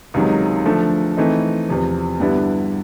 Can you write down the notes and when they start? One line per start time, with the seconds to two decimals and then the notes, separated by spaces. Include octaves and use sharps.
0.14 C#2 C3 D#3 F#3
0.66 D3 F3 A3
1.17 E3 A3 C4 D#4
1.69 E2 C3 F3
2.20 G2 D3 G3 B3 E4